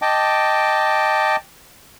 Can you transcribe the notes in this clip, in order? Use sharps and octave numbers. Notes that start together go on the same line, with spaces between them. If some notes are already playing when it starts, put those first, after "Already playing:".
D#5 G5 A5 D6